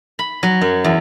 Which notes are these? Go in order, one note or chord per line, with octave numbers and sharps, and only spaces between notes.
B5
F#3
F#2
E2